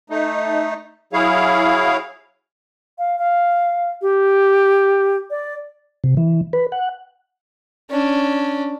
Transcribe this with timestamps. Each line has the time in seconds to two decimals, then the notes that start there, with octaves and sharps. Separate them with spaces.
0.10 A3 D#4
1.13 F#3 E4 G#4 C#5 F5
2.99 F5
3.19 F5
4.02 G4
5.30 D5
6.04 C3
6.17 E3
6.53 B4
6.72 F#5
7.90 C#4 D4